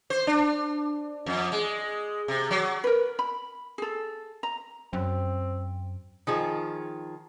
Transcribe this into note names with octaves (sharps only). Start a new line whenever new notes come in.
C5
D4
F2
G#3
C3
F#3
A#4 B4
B5
G#4 A4
A#5
F#2 C4
D#3 F3 G#4